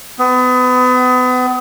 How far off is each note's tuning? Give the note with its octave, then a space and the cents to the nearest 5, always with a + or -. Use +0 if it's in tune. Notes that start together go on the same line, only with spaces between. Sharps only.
B3 +30